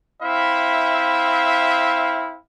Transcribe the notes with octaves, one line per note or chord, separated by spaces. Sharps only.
C4 E4 E5 F5 B5